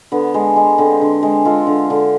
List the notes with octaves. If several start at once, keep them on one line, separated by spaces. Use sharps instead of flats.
D3 B3
G#3
G#3
D3 C4
D3
G#3
G#3 F4 A4
D3
D3